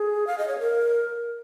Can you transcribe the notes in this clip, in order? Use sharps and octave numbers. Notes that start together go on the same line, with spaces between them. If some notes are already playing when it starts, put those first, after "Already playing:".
Already playing: G#4
F5
D#5
C#5
A#4